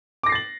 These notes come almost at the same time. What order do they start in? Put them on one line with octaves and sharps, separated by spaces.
D6 A#6 C7 A6 F#7